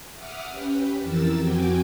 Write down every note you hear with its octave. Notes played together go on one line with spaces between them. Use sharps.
E5 F#5 D6 D#6 F6
C#4 G4 B4
F2 E3 G4 A#4 E6 A6
F2 C4 F#4 G5 G#5 D6